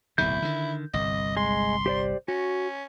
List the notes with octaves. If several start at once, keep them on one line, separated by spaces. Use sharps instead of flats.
D1 B1 C3 E4 G6
D3 D#3
G1 C2 D#5
G#3 C6
G4 C5 D5
C#4 F#4